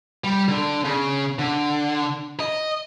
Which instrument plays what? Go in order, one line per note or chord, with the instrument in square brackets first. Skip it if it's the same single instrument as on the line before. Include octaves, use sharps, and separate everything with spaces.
[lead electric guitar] G3
D3
C#3
D3
D#5